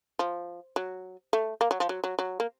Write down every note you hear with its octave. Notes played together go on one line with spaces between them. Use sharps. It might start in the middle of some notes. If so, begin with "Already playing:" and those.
F3
F#3
A3
A#3
F#3
F3
F#3
F#3
F#3
A#3